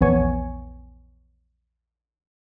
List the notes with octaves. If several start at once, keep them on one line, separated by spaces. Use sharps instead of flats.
A#1 E2 B3 C#5 G#5 C#6